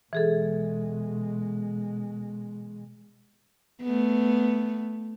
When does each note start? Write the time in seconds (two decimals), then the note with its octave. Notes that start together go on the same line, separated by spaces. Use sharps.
0.13 B2 E3 G#3 G#4 A4
3.82 A3 B3